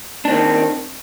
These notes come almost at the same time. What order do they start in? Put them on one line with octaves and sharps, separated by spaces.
D4 C4 D#3